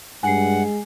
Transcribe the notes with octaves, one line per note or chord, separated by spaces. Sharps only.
G2 G#3 F#5 G#5 C7